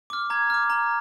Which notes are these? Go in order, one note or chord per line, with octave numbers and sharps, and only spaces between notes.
D6 F6
A#5 G#6
D6 F6
A#5